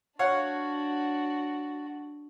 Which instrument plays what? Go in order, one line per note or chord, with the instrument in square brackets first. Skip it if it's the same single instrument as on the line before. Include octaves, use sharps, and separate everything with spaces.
[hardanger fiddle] D4 F#4 [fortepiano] C#5 F5 F#5